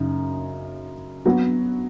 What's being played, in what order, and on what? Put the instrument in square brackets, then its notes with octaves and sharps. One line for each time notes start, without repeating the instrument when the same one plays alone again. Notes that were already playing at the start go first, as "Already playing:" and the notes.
Already playing: [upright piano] F#2 C#3 D#4
F#3 B3 F#4